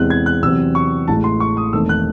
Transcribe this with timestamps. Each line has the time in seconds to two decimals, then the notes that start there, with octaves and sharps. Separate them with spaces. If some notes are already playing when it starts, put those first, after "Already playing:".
Already playing: E2 C3 E3 G#3 C4 F#6
0.10 G#6
0.26 F#6
0.42 E2 C3 F#3 C4 E6
0.75 C#6
1.08 A1 A2 G#3 A5
1.24 C6
1.40 C#6
1.57 D#6
1.73 E1 E2 D#3 A3 C4 E6
1.89 F#6